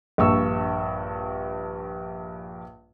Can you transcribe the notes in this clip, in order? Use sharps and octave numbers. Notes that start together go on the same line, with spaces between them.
A#1 G2 C#6 E6